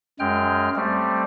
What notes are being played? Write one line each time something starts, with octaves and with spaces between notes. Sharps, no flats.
F#2 G#3 G5 F6
G3 A3 C4